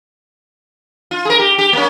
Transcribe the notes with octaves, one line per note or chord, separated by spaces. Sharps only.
F4
G#4 A#4
G4
G4
A#3 C#4